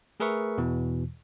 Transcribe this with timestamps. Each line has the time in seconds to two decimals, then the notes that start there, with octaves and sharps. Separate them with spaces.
0.20 A3 G#4 A#4 B4 E5 C#6
0.58 E2 B2 E3